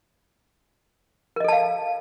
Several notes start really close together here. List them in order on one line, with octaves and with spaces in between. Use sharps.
A#4 D#5 A4 A5 F5